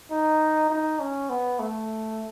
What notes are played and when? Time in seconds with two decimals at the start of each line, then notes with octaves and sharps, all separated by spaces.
0.11 D#4
0.70 D#4
0.99 C#4
1.30 B3
1.59 A3